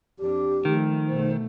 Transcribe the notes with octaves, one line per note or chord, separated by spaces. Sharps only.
F2 D4 G4
D#3 F3 A3
B2 A3 C5